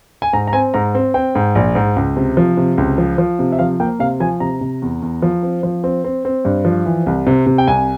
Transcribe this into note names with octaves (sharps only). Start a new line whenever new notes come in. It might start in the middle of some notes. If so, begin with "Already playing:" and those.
G#5
G#2 A#5
A#5
C4 G#5
G#2 A#5
C4
C4 G5
G#2
A#1
G#2
C#2
C3
F3
C3
C#2
F3
F3
C3
E5
F3 F5
A#3 G5
C3 F5
F3 G#5
C3 A#5
C3
E2
E2
F3
C4
F3
C4
C4
C4
G2
F3
E3
C2
C3
C3
G5
C2 G#5